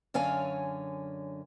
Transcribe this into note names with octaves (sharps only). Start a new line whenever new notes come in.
F#2 D3 C#5 F5 G#5